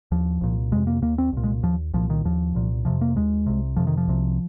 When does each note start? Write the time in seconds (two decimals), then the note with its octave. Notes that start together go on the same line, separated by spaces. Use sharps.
0.12 D#2 F3
0.41 C2 A#2
0.72 F2 C3 G#3
0.87 A#3
1.02 D#2 A#3
1.18 C4
1.32 C2 A#2
1.44 G#3
1.63 D#2 F3
1.93 C2 A#2 F3
2.10 D#3
2.25 D#2 F3
2.55 C2 A#2
2.85 F2 C3 F3
3.01 A#3
3.16 D#2 G#3
3.47 C2 C3
3.76 F2 C3 F3
3.87 D#3
3.97 F3
4.08 C2 C3